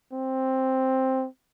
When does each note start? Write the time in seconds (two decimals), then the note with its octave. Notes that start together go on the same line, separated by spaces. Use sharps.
0.13 C4